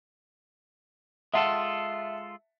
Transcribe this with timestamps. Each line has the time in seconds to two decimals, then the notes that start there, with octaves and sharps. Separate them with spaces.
1.34 G#3 F4 A4 E5 F#5 A5